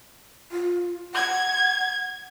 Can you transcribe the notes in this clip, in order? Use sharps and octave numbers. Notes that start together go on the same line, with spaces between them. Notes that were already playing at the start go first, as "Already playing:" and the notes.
F4
F#5 G#6